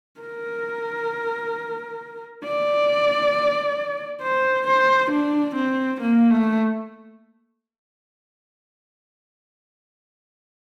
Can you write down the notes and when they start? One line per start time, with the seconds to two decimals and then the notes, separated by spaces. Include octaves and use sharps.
0.21 A#4
2.44 D5
4.22 C5
4.67 C5
5.11 D4
5.56 C4
6.01 A#3
6.31 A3